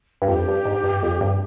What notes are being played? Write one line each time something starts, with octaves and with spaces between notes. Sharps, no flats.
G2
F2 G4
G2
G#2
G2
F2
G2